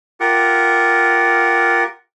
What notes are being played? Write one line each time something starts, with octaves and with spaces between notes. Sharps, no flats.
F4 G4 A#4 F#5